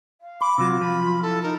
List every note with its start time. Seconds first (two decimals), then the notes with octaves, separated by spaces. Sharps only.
0.21 F5
0.41 B5 D6
0.58 C3 F#3 F4
0.81 F3 B5
1.22 E4 A4
1.42 D#4 A#4